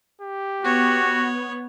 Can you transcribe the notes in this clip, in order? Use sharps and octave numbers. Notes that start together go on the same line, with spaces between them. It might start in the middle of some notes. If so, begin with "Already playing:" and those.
G4
B3 F#4 C#5